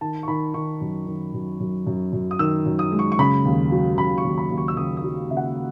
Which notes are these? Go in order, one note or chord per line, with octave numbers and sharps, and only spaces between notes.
D#3 A5
C#6
D#3 B5
D#3 C#6
F#2
D#3
F#2
F#2
F#2
F#2
D#6
D#3 E6
F#2
D#6
G#3
C#6
C#6
C#3 B5
D#2
F#3
C#3 B5
C#6
D#2
B5
D#2
C#6
E6
C#3 D#6
D#6
F#3
C#3 E5
F#5